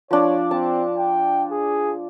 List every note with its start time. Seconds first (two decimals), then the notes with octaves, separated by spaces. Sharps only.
0.11 F3 D4 C#5
0.51 C4 A5
0.97 G5
1.51 G#4